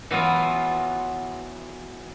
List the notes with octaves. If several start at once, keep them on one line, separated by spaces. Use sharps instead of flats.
E3 F#3 B3 F4